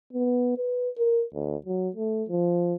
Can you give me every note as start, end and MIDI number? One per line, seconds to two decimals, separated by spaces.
0.13 0.56 59
0.58 0.90 71
0.98 1.23 70
1.34 1.56 38
1.67 1.89 54
1.96 2.24 57
2.29 2.75 53